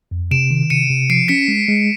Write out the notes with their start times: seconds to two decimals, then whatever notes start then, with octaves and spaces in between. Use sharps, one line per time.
0.11 F2
0.31 C3 D7 E7
0.51 D#3
0.70 C3 C#7 D#7
0.90 C3
1.10 F3 C7 D7
1.28 C#4 B6 C#7
1.48 G#3
1.68 G#3